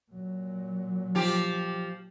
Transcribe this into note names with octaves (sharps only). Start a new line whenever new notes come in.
A#2 F#3
F3 G4